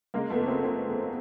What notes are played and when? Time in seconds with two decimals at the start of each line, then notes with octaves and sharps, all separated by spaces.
0.14 C#3 G#3 A#3
0.30 A3 B3
0.38 F#1
0.47 A#3 C4
0.63 F#1 A#3 C4
0.88 E2